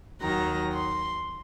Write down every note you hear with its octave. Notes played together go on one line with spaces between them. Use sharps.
D#2 D#3 F#3 A#5
C6